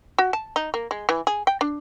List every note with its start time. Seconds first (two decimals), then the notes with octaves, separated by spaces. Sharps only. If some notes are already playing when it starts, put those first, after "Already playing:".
0.18 F#4
0.33 A5
0.56 D#4
0.74 A#3
0.91 G#3
1.09 E3
1.27 G#4
1.47 G5
1.61 D4